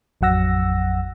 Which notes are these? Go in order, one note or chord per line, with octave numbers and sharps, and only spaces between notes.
A1 F2 F#3 F#5 E6 A#6